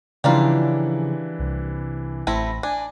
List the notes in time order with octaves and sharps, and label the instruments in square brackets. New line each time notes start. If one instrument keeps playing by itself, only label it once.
[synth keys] C#3 F3 [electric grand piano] E3 D4 E4 [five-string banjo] G3 A#3 F4
[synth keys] C2 C3
[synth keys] A1 B5 A#6 [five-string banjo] A3 C4 E4
[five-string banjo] D4 [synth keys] G#5